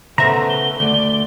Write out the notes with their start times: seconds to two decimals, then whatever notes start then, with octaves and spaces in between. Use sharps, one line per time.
0.18 C#3 A3 B3 C5 E5 A#5
0.50 G7
0.80 D2 A3 D5